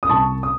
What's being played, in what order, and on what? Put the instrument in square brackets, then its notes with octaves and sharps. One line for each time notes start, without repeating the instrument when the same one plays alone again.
[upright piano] D#6
C2 A5 C#6
D#6